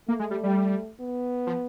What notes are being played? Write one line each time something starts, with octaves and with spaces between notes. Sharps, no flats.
A3 A#3
G#3
G3
G3
B3
F3